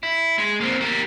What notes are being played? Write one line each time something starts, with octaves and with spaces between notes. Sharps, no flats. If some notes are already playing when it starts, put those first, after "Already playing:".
E4
G#3
A#3 C4
G4 A#4